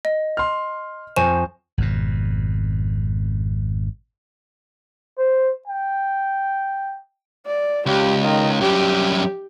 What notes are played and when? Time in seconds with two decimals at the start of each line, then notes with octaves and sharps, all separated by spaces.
0.05 D#5
0.37 C6 F6
1.16 F2 C5 G#5 C#6 E7
1.78 G#1 F2 B2
5.19 C5
5.68 G5
7.46 D5
7.86 C#2 G4
8.24 D#3
8.61 F#2 G3 G4